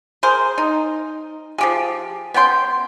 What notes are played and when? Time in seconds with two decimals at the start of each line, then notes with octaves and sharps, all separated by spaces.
0.23 G#4 A#4 C5
0.58 D#4
1.58 F3 G4 G#4
2.34 B3 C#4 G5 C6